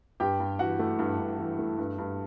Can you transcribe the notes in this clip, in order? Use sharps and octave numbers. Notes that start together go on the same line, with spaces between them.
G2 G4 G5
G2
E3 F#4 F#5
A3
G2
G2
E3
A3
G2
G2